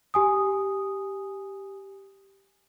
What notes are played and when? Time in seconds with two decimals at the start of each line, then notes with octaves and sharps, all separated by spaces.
0.14 G4 G#5 D#6